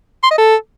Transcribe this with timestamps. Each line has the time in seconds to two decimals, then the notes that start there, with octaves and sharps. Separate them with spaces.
0.23 C6
0.31 D#5
0.38 A4